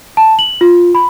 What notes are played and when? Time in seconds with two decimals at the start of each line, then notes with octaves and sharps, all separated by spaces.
0.17 A5
0.39 F#7
0.61 F4
0.95 B5